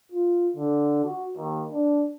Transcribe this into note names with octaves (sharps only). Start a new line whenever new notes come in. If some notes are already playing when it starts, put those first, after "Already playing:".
F4
D3
F#4
D#2
D4